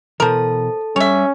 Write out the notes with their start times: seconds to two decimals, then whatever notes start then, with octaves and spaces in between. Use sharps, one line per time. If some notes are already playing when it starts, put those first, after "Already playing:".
0.20 B2 E3 A4 A#4 C5 A5
0.96 G3 C#4 C#5 E5